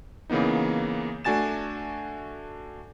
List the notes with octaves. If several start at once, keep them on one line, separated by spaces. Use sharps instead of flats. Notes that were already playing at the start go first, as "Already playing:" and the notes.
C#3 E3 A#3 B3 D#4
A3 D4 F#4 G#5 A6 E7